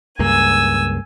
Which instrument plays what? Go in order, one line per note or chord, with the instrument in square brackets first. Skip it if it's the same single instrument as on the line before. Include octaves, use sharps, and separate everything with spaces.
[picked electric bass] C#2 G2 A#3 [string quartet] G#5 E6